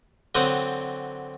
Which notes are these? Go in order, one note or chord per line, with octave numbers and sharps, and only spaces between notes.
D3 F#3 C4 F#5 G5 D#6